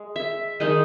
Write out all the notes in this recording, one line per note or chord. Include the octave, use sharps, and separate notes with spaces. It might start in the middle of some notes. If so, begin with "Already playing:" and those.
Already playing: G#3
E5
D#3 G#3 D#4 D#5